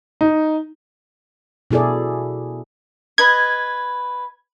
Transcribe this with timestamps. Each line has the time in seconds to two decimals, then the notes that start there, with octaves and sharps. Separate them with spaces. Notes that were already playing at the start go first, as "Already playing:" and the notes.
0.21 D#4
1.71 B2 E4 G#4 A4 D5
3.18 B4 D#5 G#6